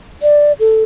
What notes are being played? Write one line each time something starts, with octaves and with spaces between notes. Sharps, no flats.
D5
A4